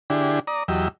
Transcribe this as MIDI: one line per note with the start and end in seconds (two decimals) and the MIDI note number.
0.10 0.39 50
0.10 0.39 62
0.10 0.39 64
0.10 0.39 67
0.10 0.39 68
0.47 0.63 74
0.47 0.63 82
0.47 0.63 87
0.68 0.88 40
0.68 0.88 54
0.68 0.88 67
0.68 0.88 75
0.68 0.88 88